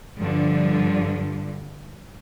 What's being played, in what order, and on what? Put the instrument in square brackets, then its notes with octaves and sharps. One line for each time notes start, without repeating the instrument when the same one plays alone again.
[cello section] G2 D3 F3